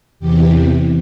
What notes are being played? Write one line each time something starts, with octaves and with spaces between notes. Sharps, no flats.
E2 C3 E3 G4